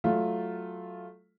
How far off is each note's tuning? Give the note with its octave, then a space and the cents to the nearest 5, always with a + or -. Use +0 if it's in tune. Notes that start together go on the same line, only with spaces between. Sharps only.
F#3 +0 A3 -15 F4 +0